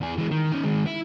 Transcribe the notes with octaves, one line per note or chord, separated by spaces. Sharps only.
E2 G#4
E3 G#3
D#3
C#4 D#4
D#3 G#3
E4